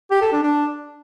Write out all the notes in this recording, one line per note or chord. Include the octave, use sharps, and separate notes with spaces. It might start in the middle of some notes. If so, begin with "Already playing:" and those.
G4
A4
D4
D4